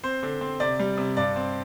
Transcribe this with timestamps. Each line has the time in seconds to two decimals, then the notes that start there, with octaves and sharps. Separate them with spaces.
0.04 C4 C5
0.23 D3
0.41 C4
0.60 C3 D5
0.79 G3
0.98 C3
1.17 G2 D5
1.36 C4